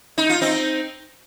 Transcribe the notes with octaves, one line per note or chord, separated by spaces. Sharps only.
D#4
F4
C4 D#4